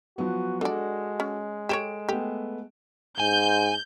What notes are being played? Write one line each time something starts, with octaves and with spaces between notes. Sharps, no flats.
F3 F#3 B3 F#4
G#3 D4 F#4 A4 D5
C#4
G4 A4 C5 C#5 D7 E7
A3 B3 G4
G#2 G#5 G6